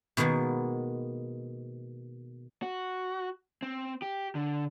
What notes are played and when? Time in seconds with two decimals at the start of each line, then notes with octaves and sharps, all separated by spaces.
0.17 B2 D#3 G#3 A#3 B3
2.63 F#4
3.63 C4
4.02 G4
4.35 D3